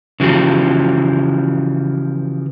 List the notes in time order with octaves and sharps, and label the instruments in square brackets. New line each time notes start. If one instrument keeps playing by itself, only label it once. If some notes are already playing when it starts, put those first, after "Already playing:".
[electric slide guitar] C#3 E3 F3 F#4 G4